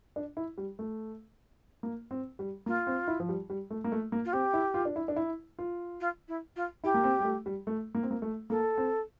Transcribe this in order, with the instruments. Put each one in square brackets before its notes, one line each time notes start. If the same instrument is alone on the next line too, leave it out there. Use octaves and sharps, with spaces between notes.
[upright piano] D4
E4
G3
A3
A#3
C4
G3
[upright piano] A#3 [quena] F4
[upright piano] C4
E4
F3
G3
G3
A3
A#3
A3
A#3
[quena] F4
[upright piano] C4 [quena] G4
[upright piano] E4
F4
D4
E4
D4
E4
F4
[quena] F4
E4
F4
[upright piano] E4 [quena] G4
[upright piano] A#3
C4
G3
A3
G3
A3
A#3
C4
A#3
A3
[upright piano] A#3 [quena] A4
[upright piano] C4